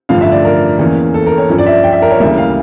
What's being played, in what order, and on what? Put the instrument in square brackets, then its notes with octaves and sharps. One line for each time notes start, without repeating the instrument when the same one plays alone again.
[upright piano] A1 G2 D3 F3 F5
E5
D5
A#4
E2 E3 A#3 C#4
A4
A#4
C#5
G2 F3 C#4
D5
E5
G5
E5
A#4
C#5
D2 C#3 E3 G3 A#3 E5
F5